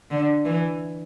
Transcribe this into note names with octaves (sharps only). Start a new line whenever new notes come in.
D3
E3